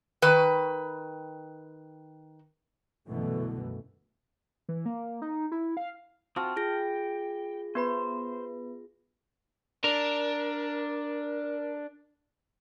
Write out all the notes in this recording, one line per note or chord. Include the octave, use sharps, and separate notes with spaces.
D#3 B4
C2 F#2 B2 D3 E3 A3
E3
A#3
D#4
E4
F5
C4 F4 F#4 A5 F6
F4 G#4 G5 A#6
B3 B4 C5 B5
D4 A#4